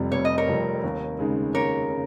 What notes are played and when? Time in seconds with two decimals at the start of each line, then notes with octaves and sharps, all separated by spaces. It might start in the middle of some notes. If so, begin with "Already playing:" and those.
Already playing: F1 F2 C3 G3
0.12 F1 C#5
0.25 D#5
0.38 A#4 C#5
0.48 F2 C3 G3
0.84 D#2
1.19 C#3 G#3 D#4
1.54 D#2 A#4 C#5
1.90 C#3